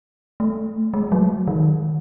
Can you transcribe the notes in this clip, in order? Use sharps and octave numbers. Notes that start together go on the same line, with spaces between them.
A3
G#3
F#3
D#3